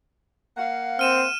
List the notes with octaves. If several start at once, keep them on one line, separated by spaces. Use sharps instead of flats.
A#3 F5 F#5
C4 F6 D#7 E7